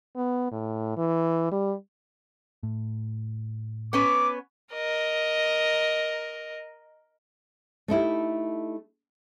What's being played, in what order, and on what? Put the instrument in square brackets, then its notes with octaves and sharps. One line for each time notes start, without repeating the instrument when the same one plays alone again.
[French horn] B3
A2
E3
G3
[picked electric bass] A2
[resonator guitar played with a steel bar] B3 C#4 B4 [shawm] D6
[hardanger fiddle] A#4 D#5
[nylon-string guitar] A3 D#4 E4 G4